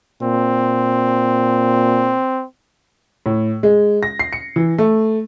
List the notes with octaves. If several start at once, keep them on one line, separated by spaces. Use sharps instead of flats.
A#2 C4
A2
G#3
A#6
C7
C#7
E3
A3